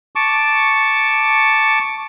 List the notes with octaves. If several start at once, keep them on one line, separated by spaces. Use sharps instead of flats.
A5 C#6 D6